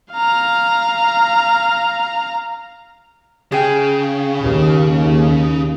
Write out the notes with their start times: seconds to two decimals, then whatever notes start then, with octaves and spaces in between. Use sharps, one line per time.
0.13 F5 A#5
3.52 C#3 G#4 G5
4.43 D#2